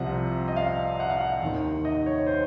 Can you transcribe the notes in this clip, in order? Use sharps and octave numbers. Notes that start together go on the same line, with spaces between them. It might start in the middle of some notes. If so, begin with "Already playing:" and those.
Already playing: C2 C3 F3 F#5
D#5
F5
F#5
F5
F#5
D#2 D#3
D#5
C#5
C5